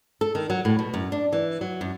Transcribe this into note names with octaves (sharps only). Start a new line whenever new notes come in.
A4
D#3
F#3
A2
B2
F#2
D4
E3
F#3
F#2